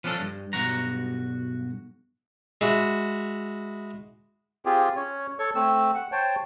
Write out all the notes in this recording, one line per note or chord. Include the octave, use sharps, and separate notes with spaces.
F3 B3 C#4 D4 A4
G2
B1 G2 F#4 A#5
G#3 E4 F#4
C4 F4 G4 G#4
C#4 C#5
A4 C#5 C#6
A3 C4 E6
F#5
C5 C#5 G5 A5